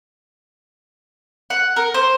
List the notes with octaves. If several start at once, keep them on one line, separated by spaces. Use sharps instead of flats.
F#5
A#4
C5